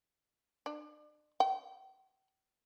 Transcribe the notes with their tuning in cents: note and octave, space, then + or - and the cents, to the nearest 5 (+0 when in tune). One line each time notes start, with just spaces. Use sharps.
D4 +40
G5 -35